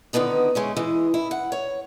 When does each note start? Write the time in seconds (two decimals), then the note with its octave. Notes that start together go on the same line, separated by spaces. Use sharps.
0.13 D3 D#3 F3 B3 D#4
0.55 G#3 A3 C#4
0.77 E3 G#3
1.14 E4
1.31 F#5
1.52 C#5